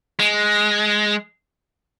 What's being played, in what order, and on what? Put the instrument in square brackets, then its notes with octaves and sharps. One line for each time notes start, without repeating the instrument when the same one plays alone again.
[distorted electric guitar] G#3